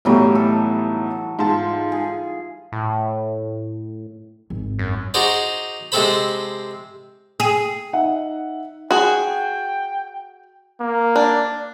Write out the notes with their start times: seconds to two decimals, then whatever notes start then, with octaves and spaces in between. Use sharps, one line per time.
0.05 B1 A2 E3 F#3 G3 A3
0.35 A4
1.39 G#2 F4 A5
1.92 G#4
2.72 A2
4.50 G#1
4.79 F#2
5.14 D#4 F#4 G#4 C5 D5
5.92 C3 G#3 C4 A4 C5 B5
7.40 G#4
7.93 D#4 E5 F#5
8.91 F#4 G#4 G5
10.80 A#3
11.16 D4